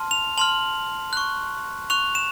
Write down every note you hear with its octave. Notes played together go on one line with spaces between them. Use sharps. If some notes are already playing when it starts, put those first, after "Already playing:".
Already playing: A5 C6 F6
F7
A5 C6 F6 F#7
C#6 F#6
C#6 F#6 F7
E7